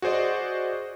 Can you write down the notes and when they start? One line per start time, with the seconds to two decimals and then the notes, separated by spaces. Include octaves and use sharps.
0.02 F#4 G#4 C5 D5 D#5